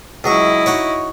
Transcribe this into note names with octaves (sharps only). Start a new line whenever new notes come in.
C#2 F#3 E4 D#5 C#6
D#4 F#4 C#5